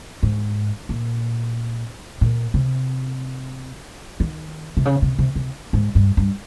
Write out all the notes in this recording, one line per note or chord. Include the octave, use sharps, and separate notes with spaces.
G#2
A#2
A#2
C3
D#3
C3
C#3
C3
C3
C3
G#2
G2
G2